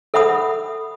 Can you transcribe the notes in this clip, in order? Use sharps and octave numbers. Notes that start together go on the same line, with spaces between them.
A4 E5 F#5 B5 D#6